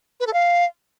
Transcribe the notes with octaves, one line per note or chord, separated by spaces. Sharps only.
B4
A4
F5